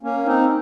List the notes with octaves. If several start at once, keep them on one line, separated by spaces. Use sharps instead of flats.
A#3 C#4
C4 D#4